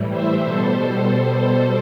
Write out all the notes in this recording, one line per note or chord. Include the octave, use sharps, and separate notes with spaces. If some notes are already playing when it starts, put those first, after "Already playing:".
Already playing: A2 E3 G3
C5 E5
B2 G3 A4 C5